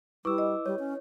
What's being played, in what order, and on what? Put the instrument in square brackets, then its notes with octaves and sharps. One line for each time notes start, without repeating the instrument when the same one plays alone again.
[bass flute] G3 [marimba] E4 B4 C#6 [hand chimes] D6 E6
[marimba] D#5
[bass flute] G3 [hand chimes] C#5
[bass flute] C#4